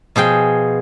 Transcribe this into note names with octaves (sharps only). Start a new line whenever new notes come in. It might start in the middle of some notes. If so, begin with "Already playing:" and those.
B2 F3 G#4 G5